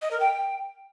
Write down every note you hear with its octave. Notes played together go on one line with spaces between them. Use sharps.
D#5
A#4
G5